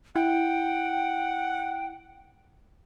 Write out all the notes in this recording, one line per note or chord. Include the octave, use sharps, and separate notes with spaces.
E4 F#5 G5